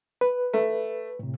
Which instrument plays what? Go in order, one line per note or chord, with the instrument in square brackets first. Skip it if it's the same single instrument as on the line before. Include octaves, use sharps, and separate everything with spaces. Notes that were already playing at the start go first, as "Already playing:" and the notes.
[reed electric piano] B4
[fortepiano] A3
[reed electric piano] A2 C3